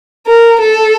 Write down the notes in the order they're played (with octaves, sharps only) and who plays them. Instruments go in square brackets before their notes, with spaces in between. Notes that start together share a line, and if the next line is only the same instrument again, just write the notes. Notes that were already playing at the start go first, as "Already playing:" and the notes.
[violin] A#4
A4